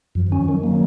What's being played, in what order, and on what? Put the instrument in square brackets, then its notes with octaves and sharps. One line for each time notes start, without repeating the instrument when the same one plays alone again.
[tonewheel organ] F#2 [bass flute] F3
[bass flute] D#3
[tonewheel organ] C#4
[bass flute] F3
[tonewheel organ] D#3 [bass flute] F#3
[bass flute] F#3 [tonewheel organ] A#3